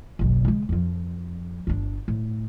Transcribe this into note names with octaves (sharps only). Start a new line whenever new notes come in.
F#1 B1
C#3 G#3
F2 F3
G1 D4
A2